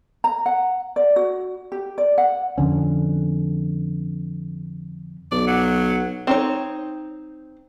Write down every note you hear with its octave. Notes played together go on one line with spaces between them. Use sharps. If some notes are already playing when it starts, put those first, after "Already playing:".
A#5
F#5
D5
F#4
G4
D5
F#5
F2 D3 C#4
B1 D5
F#3
C4 D#4 C#5